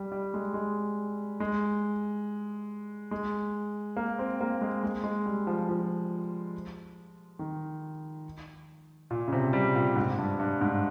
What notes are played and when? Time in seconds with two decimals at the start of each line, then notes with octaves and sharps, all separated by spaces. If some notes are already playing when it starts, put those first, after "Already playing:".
Already playing: G3
0.12 G3
0.34 G#3
0.54 G#3
1.40 G#3
3.11 G#3
3.97 A#3
4.19 C4
4.41 A#3
4.61 G#3
4.83 G#3
5.04 G#3
5.26 G3
5.47 F3
5.69 F3
7.39 D#3
9.10 A#2
9.28 C#3
9.32 C3
9.53 G3
9.75 A#2
9.96 G#2
10.18 G2
10.39 G2
10.61 G#2